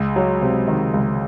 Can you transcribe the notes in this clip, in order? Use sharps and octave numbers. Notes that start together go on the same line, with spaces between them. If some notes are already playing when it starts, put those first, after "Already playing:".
Already playing: C#2
F#3
C3
D#3
C#2